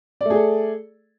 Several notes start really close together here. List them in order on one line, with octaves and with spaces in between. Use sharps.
D5 A3 G#4 A4